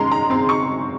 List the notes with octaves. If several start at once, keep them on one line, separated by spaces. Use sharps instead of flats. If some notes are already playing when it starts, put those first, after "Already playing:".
Already playing: C#3 G#3 A#5 C6
A#5
C4 C6
C#6